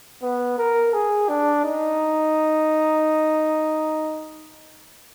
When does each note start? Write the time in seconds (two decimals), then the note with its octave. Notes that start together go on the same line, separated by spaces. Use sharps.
0.23 B3
0.58 A#4
0.94 G#4
1.29 D4
1.65 D#4